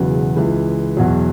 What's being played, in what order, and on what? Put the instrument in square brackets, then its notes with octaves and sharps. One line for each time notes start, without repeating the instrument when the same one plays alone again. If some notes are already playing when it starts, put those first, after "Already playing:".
Already playing: [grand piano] E1 E2 C#3 F#3 B3
C#2 C#3 E3
E2 B2 F#3